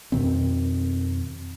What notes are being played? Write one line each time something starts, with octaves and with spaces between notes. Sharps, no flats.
F2 B2 D#3 C4